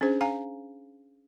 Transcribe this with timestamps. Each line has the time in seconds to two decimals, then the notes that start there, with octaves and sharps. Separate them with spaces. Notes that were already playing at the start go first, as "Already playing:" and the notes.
0.01 C#4 D4 G#4 C5
0.21 F5 G#5 A#5